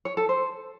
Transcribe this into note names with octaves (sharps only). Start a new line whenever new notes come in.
C#5
A4
C5